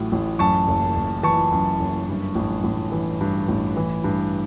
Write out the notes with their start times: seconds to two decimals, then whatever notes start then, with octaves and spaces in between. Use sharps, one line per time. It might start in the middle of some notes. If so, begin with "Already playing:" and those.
Already playing: A1 A2 F#3
0.12 A1
0.39 F#2 A5 C#6
0.68 F#1
0.96 F#1
1.23 E3 A5 C#6
1.52 F#2
1.79 F#1
2.09 G2
2.35 A1
2.64 A1
2.92 E3
3.21 G2
3.48 A1
3.77 E3
4.04 G2